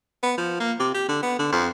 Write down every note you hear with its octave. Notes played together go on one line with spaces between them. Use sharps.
B3
F3
A#3
C3
G4
D3
B3
D3
F2